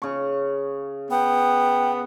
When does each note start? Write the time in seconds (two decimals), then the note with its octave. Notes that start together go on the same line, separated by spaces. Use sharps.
0.02 C#3 C#6
1.11 B3 G5